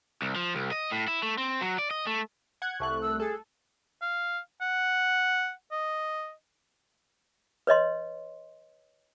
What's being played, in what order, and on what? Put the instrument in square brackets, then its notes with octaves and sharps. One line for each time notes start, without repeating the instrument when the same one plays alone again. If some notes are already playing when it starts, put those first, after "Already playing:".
[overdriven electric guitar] C2
F3
C2
D#5
A2
E4
A3
C4
F#3
D5
D#5
A3
[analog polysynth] F#5 F#6 G#6
[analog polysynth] C2 A3 F#6 [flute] C#6
[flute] E6
[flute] G#4 [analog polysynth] A4
[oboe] F5
F#5
D#5
[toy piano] B4 C#5 D#5 C6